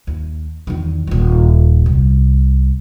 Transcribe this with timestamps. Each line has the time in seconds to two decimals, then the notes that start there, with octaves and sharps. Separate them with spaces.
0.07 D#2
0.67 E2 D#3
1.07 D#1 D#2
1.86 C2